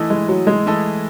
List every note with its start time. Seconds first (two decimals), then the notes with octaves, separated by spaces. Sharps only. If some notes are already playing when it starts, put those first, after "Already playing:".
Already playing: E3 A3 E4 A4 D#5
0.10 G#3
0.28 F#3
0.47 G#3
0.66 E3 A3 E4 A4 D#5